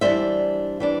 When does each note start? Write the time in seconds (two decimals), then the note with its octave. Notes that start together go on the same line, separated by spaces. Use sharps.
0.01 E3 G3 D4 C5 E5
0.80 E3 G3 D4